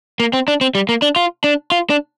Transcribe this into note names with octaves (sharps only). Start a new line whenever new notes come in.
A#3
C4
D4
C4
G3
A#3
D4
F4
D4
F4
D4